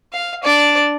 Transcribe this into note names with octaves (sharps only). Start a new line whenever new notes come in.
F5
D4 D5